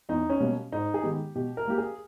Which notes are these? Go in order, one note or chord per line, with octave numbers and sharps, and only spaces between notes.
E2 D#4
C#4
B2 G3 A#3
G#2 D#4
G#4
D#3 G#3 B3 G4
B2 G4
A#4
A#3 G4
G#4